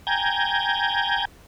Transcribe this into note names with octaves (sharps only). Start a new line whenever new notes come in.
G5 G#5 A#5 G6 G#6